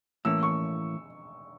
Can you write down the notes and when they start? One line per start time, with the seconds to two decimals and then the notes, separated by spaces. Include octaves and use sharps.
0.25 A2 E3 A#3 C#4 E6
0.43 C#6